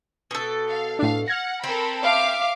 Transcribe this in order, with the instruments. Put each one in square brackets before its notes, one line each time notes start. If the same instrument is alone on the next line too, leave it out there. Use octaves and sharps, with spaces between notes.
[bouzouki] B2 A4
[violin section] F5
[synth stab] A2 D4 [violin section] F5
[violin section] F#5 [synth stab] F6 G#6 A#6
[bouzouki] C4 [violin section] A4 A#4 B5
[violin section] E5 [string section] F5 D6